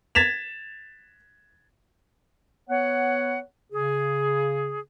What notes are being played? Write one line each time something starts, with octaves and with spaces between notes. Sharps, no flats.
G#6 A6 B6 E7 F7
B3 C#5 F#5
C#3 G#4